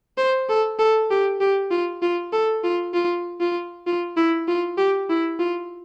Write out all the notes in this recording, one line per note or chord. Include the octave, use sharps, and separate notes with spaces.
C5
A4
A4
G4
G4
F4
F4
A4
F4
F4
F4
F4
E4
F4
G4
E4
F4